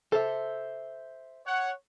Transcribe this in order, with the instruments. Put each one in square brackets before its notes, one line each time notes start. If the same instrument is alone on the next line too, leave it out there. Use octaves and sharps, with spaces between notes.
[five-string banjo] A4 [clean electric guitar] C5 E5
[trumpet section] C#5 F#5